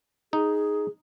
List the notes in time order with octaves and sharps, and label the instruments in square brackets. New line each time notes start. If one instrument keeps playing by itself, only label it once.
[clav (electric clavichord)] D#4 [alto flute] G#4